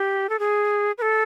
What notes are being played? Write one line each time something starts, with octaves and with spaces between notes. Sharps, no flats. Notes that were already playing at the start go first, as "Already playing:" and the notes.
Already playing: G4
A4
G#4
B4
A4